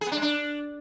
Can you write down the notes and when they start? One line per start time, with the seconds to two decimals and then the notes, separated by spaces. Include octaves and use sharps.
0.01 G#4
0.06 B3
0.12 D4
0.17 G#3
0.22 D4